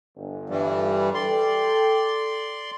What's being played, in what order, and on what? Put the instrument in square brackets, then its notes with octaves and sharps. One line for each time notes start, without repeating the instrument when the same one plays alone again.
[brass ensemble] G1
[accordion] G2 E3 G3
[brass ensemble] A4 G5 [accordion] D5 C6